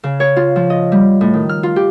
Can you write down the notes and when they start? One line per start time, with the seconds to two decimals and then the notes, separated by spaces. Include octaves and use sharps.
0.04 C#3
0.20 C#5
0.36 F4
0.56 F3
0.70 D#5
0.92 G3
1.21 A2
1.34 D#3
1.49 F6
1.63 F4
1.76 G4